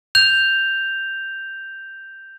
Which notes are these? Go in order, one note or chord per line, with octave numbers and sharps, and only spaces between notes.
G6 F7